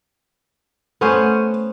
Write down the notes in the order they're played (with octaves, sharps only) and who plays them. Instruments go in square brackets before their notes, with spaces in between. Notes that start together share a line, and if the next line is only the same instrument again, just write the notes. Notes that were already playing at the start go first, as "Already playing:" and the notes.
[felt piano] A3 [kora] B3 C#4 C5